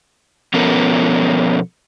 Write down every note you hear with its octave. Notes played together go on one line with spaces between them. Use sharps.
B2 F3 B3 C#4 A4 A#4